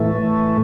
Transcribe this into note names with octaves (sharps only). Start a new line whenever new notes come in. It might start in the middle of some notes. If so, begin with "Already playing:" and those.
Already playing: A2 E3 A3